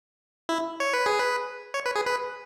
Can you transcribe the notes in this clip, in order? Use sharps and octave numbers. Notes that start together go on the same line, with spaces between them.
E4
C#5
B4
G#4
B4
C#5
B4
G#4
B4